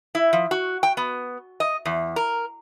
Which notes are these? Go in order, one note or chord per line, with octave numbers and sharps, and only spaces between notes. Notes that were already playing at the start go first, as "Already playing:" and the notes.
E4
F3
F#4
G5
B3
D#5
E2
A#4